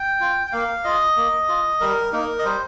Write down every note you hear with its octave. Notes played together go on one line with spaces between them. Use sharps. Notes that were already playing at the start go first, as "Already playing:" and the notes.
Already playing: G5
F4
G5
A#3 F5
F4 D#5
A#3
F4
G3 A#4
A#3 D#4 A#4
D#5
G3 C5